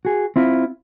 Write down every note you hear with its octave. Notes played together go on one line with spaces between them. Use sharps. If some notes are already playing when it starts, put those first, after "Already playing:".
F#4 G#4
C4 E4 F4